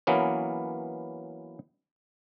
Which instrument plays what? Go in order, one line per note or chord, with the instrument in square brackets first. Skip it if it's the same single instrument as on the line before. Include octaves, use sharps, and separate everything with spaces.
[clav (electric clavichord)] E3 F#3 A#3 B3 C#4